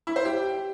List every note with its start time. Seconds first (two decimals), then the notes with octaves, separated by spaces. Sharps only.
0.07 E4
0.16 C5
0.25 G4